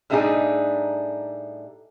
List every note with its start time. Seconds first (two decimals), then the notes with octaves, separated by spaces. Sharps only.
0.10 A2 G3 A3 D4 D#4 G#4